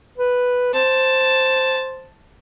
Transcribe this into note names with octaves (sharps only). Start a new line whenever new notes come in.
B4
C5 A5